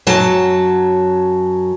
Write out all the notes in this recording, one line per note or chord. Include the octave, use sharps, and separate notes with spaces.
F#2 F#3 A5